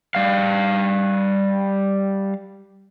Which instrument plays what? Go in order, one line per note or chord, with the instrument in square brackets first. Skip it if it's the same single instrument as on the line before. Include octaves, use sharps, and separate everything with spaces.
[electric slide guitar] G3 F5